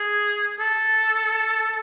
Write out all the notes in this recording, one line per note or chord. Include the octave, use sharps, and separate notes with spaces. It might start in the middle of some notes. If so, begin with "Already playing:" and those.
Already playing: G#4
A4